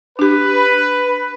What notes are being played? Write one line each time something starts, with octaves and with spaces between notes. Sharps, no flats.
D4 G4 B4